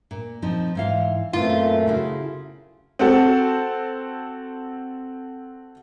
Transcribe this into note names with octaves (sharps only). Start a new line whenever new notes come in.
A#2
F3 C4 D#4
G#2 E3 F5
F#2 A#2 A3 B3 C4 F4
C#3 E4 F#4
C4 F#4 A4